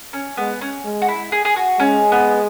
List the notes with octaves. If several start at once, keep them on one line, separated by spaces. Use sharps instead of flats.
C#4
G#3 B3
C#4
G#3
F#4
E4
G#4
G#4
F#4
G#3 C#4
B3